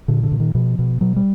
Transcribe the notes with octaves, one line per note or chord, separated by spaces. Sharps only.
A#2 D3
D3
A#2
D#3
B2 F3
B2
B2 F#3
G3